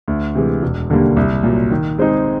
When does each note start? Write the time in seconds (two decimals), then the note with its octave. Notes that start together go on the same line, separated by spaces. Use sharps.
0.08 D2
0.35 C3 E3 G#3
0.62 E1
0.89 D#2 D3 G3 A#3
1.17 C2
1.43 A#2 F#3
1.71 D#3
1.99 G#3 C4 D#4 G#4